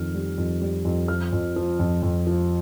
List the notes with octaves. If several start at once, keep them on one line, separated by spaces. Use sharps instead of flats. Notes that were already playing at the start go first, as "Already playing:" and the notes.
Already playing: F2 D#3 F6
G3
F2
G3
F2
F3 F6
F2
F3
F2
F2
F3